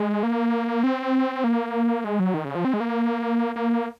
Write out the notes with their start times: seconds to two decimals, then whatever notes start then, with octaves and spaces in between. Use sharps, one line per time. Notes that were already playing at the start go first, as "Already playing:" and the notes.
Already playing: G#3
0.23 A#3
0.84 C4
1.44 A#3
2.04 G#3
2.19 F#3
2.34 D#3
2.45 C#3
2.55 F3
2.65 C4
2.74 G#3
2.80 A#3
3.56 A#3